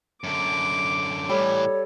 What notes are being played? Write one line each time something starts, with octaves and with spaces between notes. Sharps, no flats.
F#2 D3 D6
A2 E3 G3 A4 C#5